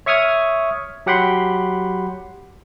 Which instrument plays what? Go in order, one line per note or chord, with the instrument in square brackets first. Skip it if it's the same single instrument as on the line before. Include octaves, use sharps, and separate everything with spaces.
[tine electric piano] C#5 E5 C#6 D#6 F6 G#6
F#3 G4 F#5 G5 B5 C6